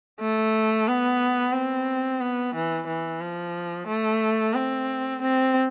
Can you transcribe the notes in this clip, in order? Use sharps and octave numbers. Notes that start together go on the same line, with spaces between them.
A3
B3
C4
B3
E3
E3
F3
A3
C4
C4